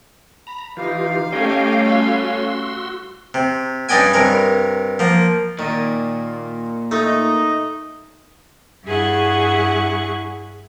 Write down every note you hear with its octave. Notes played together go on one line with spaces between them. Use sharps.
A#5 B5
E3 D#4 F4 G4 F5
G3 A3 C#4 G4 D#5 G5
F#4 C6 E6
C3
G2 C#4 D5 D#5 G5 G#5
G2 C3 A#4 C#5
F3 A#3
A#2 D#3
A3 D#4
G2 E4 G#4 F#5 C#6